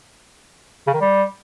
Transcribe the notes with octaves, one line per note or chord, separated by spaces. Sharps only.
C#3
D#3
G3